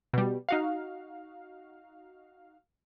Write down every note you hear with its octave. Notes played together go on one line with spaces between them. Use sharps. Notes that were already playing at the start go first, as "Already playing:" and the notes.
B2 G3
D#4 F#4 F5